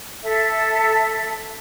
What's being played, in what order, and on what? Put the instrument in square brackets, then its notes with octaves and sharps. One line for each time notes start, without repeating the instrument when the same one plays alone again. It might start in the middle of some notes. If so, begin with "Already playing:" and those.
[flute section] A4 E5